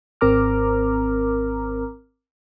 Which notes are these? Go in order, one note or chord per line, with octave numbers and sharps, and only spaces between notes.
G#1 C4 A#4 A#5 D6 F6